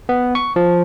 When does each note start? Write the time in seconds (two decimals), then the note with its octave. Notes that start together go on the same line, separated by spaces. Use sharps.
0.09 B3
0.35 C#6
0.56 F3